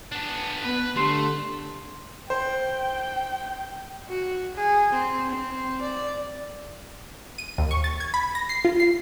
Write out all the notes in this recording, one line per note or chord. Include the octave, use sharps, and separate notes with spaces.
B3 D4
B3 B4
D3 A3 G4 C6 C7
C5 G5
F#4
G#4
C4
C4
D5
D#7
D#2
C#6
A6
G#6
B5
A#6
C7
F4
C7